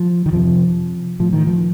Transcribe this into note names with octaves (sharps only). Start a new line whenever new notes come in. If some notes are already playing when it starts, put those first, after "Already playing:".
Already playing: F3
D#3
F2 C3 F3
A2 F3
D#3
F3